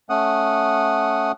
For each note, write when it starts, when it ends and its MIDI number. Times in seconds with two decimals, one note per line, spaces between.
0.10 1.32 57
0.10 1.32 61
0.10 1.32 78
0.10 1.32 87